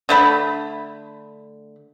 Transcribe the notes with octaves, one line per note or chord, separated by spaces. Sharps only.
D3 A3 B5